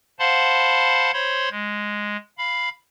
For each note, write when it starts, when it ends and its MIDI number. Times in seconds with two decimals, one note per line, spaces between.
0.19 1.11 72
0.19 1.11 77
0.19 1.11 78
0.19 1.11 81
0.19 1.11 83
0.19 1.11 84
1.13 1.49 72
1.13 1.49 73
1.13 1.49 83
1.13 1.49 84
1.51 2.17 56
2.38 2.69 77
2.38 2.69 83